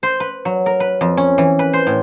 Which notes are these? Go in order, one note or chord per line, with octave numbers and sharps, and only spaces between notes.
C5
B4
F#3
A#4
B4
F2
C#4
E3
B4
C5
A2